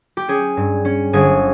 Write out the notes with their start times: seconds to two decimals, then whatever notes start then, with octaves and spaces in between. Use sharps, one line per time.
0.17 G4
0.28 C#4 G#4
0.57 G2
0.85 C#4
1.13 G1 G#4